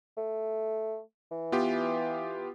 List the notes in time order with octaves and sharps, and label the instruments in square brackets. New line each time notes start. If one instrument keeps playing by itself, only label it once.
[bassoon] A3
E3
[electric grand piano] B3 F4 G4